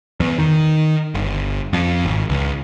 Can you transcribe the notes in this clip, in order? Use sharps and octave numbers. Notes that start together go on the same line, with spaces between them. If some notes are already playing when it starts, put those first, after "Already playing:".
E2
D#3
G1
F2
G#1
C#2